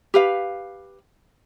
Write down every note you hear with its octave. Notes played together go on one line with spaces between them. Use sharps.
G4 B4 F5